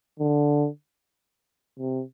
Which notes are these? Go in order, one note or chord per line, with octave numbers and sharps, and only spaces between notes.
D3
C3